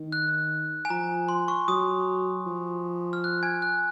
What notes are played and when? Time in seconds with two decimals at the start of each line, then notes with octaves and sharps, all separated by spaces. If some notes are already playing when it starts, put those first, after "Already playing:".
Already playing: D#3
0.12 F#6
0.85 G#5
0.90 F3 A#5
1.28 C6
1.48 C#6
1.68 F#3 D#6
2.46 F3
3.13 F6
3.24 F#6
3.43 G#5 G#6
3.62 F#6